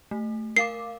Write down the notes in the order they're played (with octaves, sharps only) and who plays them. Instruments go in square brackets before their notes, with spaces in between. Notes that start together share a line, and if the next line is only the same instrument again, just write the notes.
[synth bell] A3
[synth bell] A#4 F5 D6 [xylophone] C7